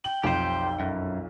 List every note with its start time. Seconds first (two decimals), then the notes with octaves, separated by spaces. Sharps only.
0.04 G5 F#7
0.23 B1 F2 G4 C5
0.80 F#2